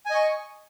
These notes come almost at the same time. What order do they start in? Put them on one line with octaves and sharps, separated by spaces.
G#5 D#5 C#6